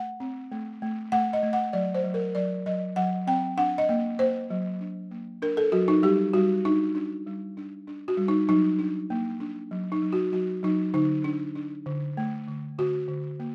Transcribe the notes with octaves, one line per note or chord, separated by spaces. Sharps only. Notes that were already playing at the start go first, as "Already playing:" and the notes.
Already playing: A3 F#5
C4
A3
A3
A3 F#5
D#5
A3
F#5
F#3 D5
C5
F#3
A#4
F#3 D5
F#3 D#5
F#3 F#5
C4 G5
D4 F#5
D#5
A#3
A#3 C5
F#3
D4
A#3
D4 A#4
A4
F#3 F#4
D#4
G3 G4
G3 F#4
D4 D#4
D4
G3
D4
D4
F#4
G3
D#4
F#3 D#4
D4
A#3
D4
F#3
D#4
F#3
F#4
F#3 F#4
F#3 D#4
D3 D#4
D4
D4
D3
A3
D3
D3 F#4
D3
A#3